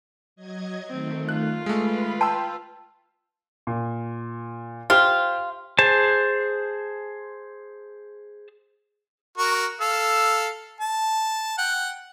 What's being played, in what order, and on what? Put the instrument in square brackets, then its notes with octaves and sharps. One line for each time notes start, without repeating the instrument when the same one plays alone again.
[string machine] F#3 D#5 G#6
[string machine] D#3 A3 [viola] C4
[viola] F4 [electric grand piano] F#6
[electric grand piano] G#3 A3 [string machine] B4 B5
[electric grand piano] G5 C6 E6 [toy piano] A5
[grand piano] A#2
[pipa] F4 [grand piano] G4 C5
[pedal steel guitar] G#4 C5 A5
[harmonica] F#4 A#4 C#6
A4 F5 E6
A5
F#5 G5